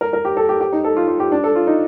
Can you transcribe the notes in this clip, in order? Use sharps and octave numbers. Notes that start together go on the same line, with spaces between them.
A#4
A#4
G4
A4
G4
G4
D#4
A4
F4
F4
G4
D4
A4
F4
D#4